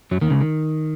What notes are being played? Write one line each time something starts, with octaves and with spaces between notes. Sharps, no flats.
F#2 F#3
D#2 D#3
C#2 C#3
D#3